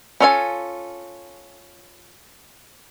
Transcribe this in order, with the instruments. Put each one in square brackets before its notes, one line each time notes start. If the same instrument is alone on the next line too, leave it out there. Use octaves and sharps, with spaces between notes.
[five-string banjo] C#4 F4 A4 D5 G#5